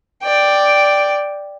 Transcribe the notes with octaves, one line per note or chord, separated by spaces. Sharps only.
D5 G5